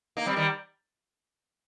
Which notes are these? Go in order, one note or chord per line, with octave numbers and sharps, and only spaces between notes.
A#3 D#4
G3 C4
D#3 G3